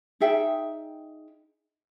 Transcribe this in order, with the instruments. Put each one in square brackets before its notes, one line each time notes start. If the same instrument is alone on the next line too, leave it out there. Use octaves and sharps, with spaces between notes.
[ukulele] D#4 G#4 E5 G5